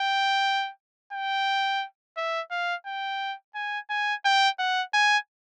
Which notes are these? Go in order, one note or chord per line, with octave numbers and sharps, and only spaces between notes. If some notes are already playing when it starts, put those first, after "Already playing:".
Already playing: G5
G5
E5
F5
G5
G#5
G#5
G5
F#5
G#5